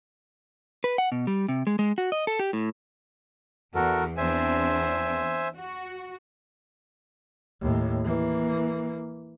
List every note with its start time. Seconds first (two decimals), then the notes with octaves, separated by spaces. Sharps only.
0.84 B4
0.98 F#5
1.12 B2
1.27 G3
1.49 C3
1.67 G#3
1.79 G#3
1.98 F#4
2.12 D#5
2.27 A4
2.39 G4
2.53 A2
3.75 E2 F#4 A4 A#4
4.17 E2 C4 D4 C5 E5 G#5
5.56 F#4
7.61 D#2 A2
8.04 E3 A#3